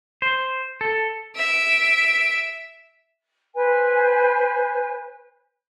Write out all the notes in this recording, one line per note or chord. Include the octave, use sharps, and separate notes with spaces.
C5
A4
E5 D7
B4 C5 G#5